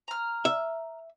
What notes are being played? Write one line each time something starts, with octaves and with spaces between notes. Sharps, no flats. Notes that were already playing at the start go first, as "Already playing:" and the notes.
A#5 F6
E5